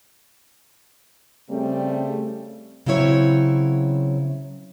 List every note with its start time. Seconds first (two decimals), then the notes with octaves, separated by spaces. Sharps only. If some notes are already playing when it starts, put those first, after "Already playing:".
1.50 C#3 G3 A3 C4
2.86 C#3 F#3 C4 E4 C#5